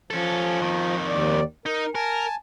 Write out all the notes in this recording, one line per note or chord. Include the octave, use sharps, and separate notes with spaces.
F3 C#4 A4
F2 D#3
D#2 D5
D#4 A#4
A#4 G#5 A5